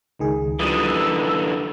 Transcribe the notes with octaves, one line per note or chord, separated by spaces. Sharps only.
C#2 D#3 G#4
D3 E3 F3 G3 D#6
E6